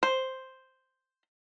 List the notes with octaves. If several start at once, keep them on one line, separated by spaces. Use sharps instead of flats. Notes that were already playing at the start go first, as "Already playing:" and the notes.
C5